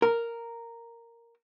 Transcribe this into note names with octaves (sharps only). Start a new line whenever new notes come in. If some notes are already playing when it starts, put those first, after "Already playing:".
A#4